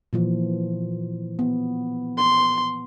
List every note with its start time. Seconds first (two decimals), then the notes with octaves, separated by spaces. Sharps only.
0.13 A#2 E3 F3
1.39 B3
2.18 C6